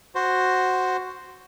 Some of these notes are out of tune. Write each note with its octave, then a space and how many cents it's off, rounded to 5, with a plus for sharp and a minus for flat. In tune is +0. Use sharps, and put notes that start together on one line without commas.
F#4 +0 C5 +0